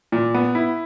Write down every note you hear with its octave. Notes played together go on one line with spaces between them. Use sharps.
A#2
B3
E4